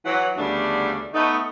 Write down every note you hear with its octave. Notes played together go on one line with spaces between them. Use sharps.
E3 F#3 F#5
D2 C#3 G3 A3 B3 D4
A3 B3 D#4